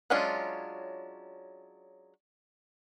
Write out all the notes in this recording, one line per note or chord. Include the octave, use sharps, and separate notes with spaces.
F#3 G#3 C#4 D4 F4